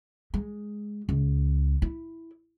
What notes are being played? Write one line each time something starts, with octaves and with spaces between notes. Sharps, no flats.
G#3
C#2
E4